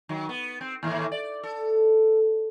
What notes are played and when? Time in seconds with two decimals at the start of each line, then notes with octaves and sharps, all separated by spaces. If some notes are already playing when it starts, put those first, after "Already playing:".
0.09 D#3 F#3
0.29 B3
0.61 C4
0.83 D#2 A2 E3
1.12 D5
1.43 A4